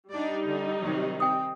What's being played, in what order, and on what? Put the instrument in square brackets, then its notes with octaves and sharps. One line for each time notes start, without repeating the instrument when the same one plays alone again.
[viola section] G3 D#4 [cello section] D4 D5
[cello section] D3
C3 D#3 F#3
[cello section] C4 [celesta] G5 D#6